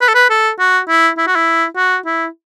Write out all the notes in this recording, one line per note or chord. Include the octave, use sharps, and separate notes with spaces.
B4
A4
B4
A4
F#4
E4
E4
F#4
E4
F#4
E4